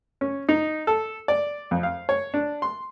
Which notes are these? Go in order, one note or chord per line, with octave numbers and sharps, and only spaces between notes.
C#4
D#4
A4
D5
F2
F5
C#5
D4
C6